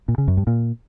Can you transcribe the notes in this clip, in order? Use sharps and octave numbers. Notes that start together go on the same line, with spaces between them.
A#2
C#3
F#2
G2
A#2